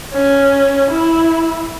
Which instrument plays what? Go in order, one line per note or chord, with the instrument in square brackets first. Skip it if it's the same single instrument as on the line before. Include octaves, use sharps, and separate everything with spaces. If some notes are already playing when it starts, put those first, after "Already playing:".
[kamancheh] C#4
E4